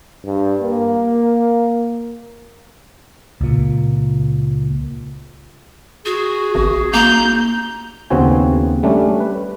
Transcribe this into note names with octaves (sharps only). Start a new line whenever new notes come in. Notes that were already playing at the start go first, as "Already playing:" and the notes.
G2
A#3
C#2 A#2
F#4 G#4
G#1
A#3 A#5 G6
D#2 C#3 B3 C4 F#4 G#5
G3 A3 C#4 D4
B4